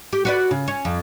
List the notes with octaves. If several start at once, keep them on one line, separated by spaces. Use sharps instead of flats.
G4
F#4 B4 D5
C#3
C#4
F2